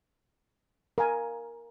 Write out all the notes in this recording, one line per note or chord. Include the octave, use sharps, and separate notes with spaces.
A#4 F5 G#5